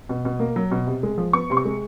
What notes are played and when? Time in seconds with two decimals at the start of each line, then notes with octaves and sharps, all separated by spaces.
0.09 B2
0.25 B2
0.39 A#3
0.56 F#3
0.71 B2
0.87 C3
1.03 G#3
1.18 F3
1.33 B3 C#6
1.50 C3 C6
1.57 C#6
1.65 G#3